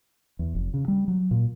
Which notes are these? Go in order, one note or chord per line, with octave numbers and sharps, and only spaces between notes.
E2
F1
C#3
G3
F#3
A#2